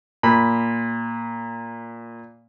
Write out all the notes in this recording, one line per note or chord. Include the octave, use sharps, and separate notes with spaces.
A#2 B5